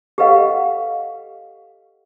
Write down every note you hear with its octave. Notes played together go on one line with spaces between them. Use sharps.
G4 A4 B4 D#5 F5 F#5